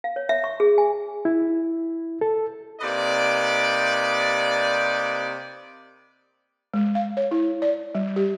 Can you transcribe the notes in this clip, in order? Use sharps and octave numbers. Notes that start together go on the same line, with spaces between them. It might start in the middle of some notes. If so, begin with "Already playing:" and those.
F5
C#5
E5
C#6
G#4
G#5
E4
A4
C3 A#3 D#4 B4 D5
G#3
F5
C#5
E4
D5
G3
G4